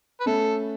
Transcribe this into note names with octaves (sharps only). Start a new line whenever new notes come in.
B4
A3 C#4 A4